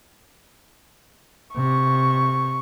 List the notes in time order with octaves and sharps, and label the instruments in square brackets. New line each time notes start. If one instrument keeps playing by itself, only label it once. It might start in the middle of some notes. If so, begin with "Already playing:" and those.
[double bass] C3 [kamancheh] C#6